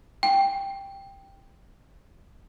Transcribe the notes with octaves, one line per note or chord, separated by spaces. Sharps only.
G5